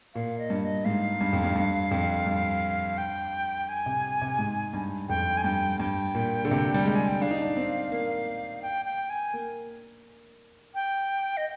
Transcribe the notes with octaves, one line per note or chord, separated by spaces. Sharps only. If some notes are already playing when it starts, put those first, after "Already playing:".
A#2 F5
D#5
G2
D#5
G#2 F5
G2
F2
G2
G2
F2
G2
G5
G#5
C3
C3
G#2
G2
F2 G5
G#5
G2 G5
G2 G5
A#2
D3
C3
G3
G#3
G#5
G5
D4 F5
D#4
D4
C4
A#3
G5
G5
G#5
A#3
G5
D#5